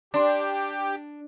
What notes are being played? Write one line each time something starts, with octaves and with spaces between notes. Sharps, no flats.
D4 G4 D5 C6